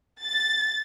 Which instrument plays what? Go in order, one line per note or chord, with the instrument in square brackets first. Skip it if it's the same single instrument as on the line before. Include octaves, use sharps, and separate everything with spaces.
[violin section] A6